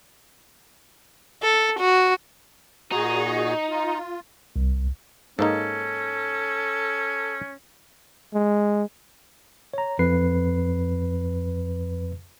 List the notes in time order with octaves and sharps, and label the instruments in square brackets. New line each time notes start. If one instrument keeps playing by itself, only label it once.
[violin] A4
F#4
[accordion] A#2 F#4 G#4 [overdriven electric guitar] D#4
[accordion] F4
[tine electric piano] C2
[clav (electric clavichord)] G#2 A#3 D#4 [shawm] C#4 [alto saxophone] A4
[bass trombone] G#3
[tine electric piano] C#5 A#5
F2 B4 C7